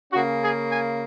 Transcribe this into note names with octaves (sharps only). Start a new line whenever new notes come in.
C#3 A#3 C#4 F#4
G#4
G#5